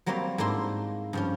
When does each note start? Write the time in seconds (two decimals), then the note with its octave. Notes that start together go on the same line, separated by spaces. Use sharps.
0.06 F#3 G3 A#3 C4 C#5 C6
0.38 G#2 A#3 D4 E4 C6
1.13 G2 F3 C#4